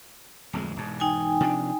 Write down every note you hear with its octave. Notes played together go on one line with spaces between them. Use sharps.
D1 F2 G#3
E1 G#2
D#4 G5 G#5
C3 F3 D4